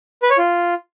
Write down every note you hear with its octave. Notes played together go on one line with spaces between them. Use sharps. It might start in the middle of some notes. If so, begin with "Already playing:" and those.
B4
C#5
F4